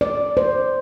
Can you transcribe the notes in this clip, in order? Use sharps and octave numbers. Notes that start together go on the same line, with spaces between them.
D5
C5